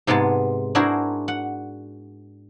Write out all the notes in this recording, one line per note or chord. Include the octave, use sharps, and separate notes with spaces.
G#2 C3 G#3 B3 A5
D4 E4 F#4 G#4 A#4 C5
F#5